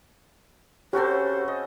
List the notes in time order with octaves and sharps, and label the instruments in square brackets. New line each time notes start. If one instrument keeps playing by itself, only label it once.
[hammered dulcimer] C#3 C4 [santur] C#4 F#4 A4 [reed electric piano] G4 [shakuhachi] C5
[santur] D#5